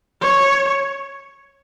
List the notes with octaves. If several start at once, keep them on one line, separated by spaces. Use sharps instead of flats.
C#5